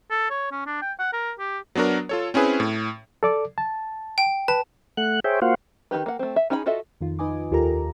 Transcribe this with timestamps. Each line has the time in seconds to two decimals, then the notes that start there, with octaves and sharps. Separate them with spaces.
0.11 A4
0.30 C#5
0.52 C#4
0.66 D4
0.82 G5
0.99 F#5
1.13 A#4
1.39 G4
1.75 F#3 B3 D4 F#4 A#4
2.09 F4 A4 C#5
2.34 C4 C#4 E4 G#4 B4
2.60 A2
3.23 A4 D5 D6
3.58 A5
4.18 G5
4.48 B4 A5
4.97 A3 F#5 F#6
5.24 G#4 C5 C#5 E5 G5
5.42 A#3 F4 F#4 C5 F5 F#5
5.91 D#3 G3 D#4 G4 B4
6.06 A#3 F#5
6.19 A3 C4
6.36 E5
6.50 C#4 D#4 G#4 B4 B5
6.66 F4 F#4 A4 D#5 E5
7.01 F2 D#3 F4
7.19 D#4 B4 D#5 G#5 D6
7.51 D#2 F4 G4 A4 A#4 A#5